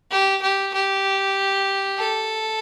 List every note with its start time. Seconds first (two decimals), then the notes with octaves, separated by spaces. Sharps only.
0.11 G4
0.41 G4
0.73 G4
1.98 A4